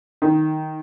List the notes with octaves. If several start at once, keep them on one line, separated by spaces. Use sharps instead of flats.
D#3